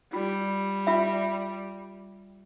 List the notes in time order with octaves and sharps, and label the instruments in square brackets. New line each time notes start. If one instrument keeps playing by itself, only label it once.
[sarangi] G3 [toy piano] F4
[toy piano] F4 E5